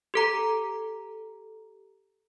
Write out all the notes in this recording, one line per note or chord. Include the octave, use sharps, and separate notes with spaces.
G4 A4 A#5